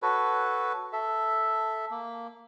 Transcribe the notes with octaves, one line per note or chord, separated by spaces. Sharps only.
F#4 A4 B4 C#5
A4 E5
A#3